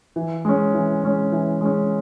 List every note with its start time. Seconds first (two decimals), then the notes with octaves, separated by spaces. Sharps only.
0.16 E3
0.45 G#3 C#4
0.74 E3
1.04 G#3 C#4
1.32 E3
1.61 G#3 C#4